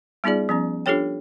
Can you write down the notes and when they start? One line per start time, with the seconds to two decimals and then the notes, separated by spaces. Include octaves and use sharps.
0.24 G3 B3 D#4 F4 G#4 D5
0.49 F3 B3 C#4
0.86 D4 F4 G4 A4 C#5 G5